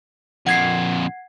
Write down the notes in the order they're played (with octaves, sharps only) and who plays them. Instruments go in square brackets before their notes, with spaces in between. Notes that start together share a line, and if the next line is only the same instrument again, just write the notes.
[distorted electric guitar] F2 A#2 [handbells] F#5 G#6 C7